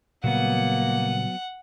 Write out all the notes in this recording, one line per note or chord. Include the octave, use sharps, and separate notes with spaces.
A#2 C#3 F#3 G3 A#3 B3 F#5